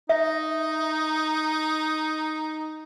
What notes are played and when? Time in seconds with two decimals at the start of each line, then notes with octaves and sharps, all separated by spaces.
0.09 D#4 E5